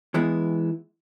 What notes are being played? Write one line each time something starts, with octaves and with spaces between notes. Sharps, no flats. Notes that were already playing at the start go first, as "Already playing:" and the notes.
E3 G#3 B3 E4